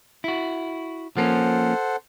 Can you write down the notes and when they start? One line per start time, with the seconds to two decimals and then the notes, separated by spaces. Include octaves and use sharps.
0.24 E4 F#4
1.17 F3 A#3 C#4 A4 C5 F#5